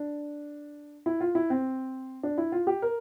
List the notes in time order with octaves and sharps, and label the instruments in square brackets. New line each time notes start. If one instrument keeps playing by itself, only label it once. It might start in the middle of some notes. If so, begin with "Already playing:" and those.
Already playing: [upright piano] D4
E4
F4
E4
C4
D4
E4
F4
G4
A#4